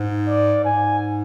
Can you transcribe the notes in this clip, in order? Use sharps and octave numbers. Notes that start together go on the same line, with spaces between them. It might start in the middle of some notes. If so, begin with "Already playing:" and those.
Already playing: G#2
D5
G#2 G#5